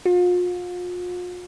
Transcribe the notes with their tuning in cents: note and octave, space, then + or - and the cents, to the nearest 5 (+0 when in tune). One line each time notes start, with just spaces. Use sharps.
F4 +40